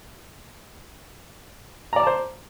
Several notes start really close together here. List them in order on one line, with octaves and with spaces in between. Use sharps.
A#5 D5 D6 A5 C5